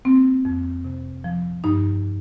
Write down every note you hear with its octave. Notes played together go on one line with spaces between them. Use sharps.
A#3 C4
F2
C3
F3
G2 D#4